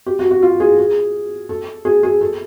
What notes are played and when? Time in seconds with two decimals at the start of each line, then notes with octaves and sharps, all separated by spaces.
0.06 G4
0.19 F#4
0.31 F#4
0.43 F4
0.60 G#4
0.78 G#4
1.49 A4
1.85 G#4
2.03 G#4
2.21 A4